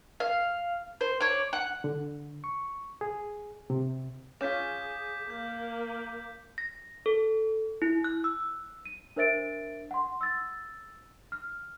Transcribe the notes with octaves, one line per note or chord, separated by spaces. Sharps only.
F5
C5
C#5 D5
F#5
D3
C#6
G#4
C3
C#4 F4 G#4 D6 G6 B6
A#3 A#4 G6
A#6
A4
E4
F#6
E6
D#7
D4 A#4 C5 E5 A6 D7
F#5 C6
E6 A6
F6